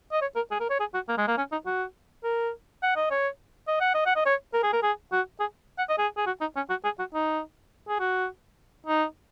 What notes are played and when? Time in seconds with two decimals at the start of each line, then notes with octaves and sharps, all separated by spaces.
0.12 D#5
0.22 C#5
0.36 A#4
0.51 G#4
0.60 A#4
0.70 C#5
0.80 G#4
0.94 F#4
1.09 A#3
1.18 G#3
1.28 A#3
1.37 C#4
1.52 D#4
1.66 F#4
2.24 A#4
2.83 F#5
2.96 D#5
3.11 C#5
3.68 D#5
3.81 F#5
3.94 D#5
4.06 F#5
4.16 D#5
4.26 C#5
4.54 A#4
4.63 G#4
4.73 A#4
4.83 G#4
5.12 F#4
5.40 G#4
5.78 F#5
5.89 D#5
5.98 G#4
6.17 G#4
6.26 F#4
6.41 D#4
6.56 C#4
6.70 F#4
6.84 G#4
6.99 F#4
7.14 D#4
7.88 G#4
8.00 F#4
8.87 D#4